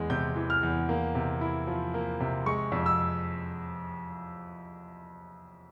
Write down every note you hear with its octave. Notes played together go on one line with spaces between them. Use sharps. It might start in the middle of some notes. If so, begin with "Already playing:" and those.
Already playing: E2 E3 G#3
C3 G6
E3
F6
E2
A#3
C3
E4
F3
A#3
C3
G#3 C#6
F2
E6